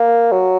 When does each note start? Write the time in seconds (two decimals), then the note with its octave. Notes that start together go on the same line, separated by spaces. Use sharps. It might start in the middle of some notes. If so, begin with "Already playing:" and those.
Already playing: A#3
0.32 F#3